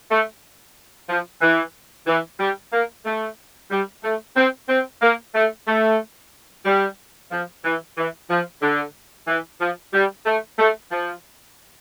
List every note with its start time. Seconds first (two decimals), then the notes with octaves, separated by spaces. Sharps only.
0.11 A3
1.10 F3
1.42 E3
2.07 E3
2.40 G3
2.73 A#3
3.05 A3
3.71 G3
4.04 A3
4.37 C4
4.69 C4
5.02 A#3
5.35 A3
5.68 A3
6.66 G3
7.31 F3
7.64 E3
7.97 E3
8.30 F3
8.62 D3
9.28 E3
9.61 F3
9.93 G3
10.26 A3
10.59 A3
10.92 F3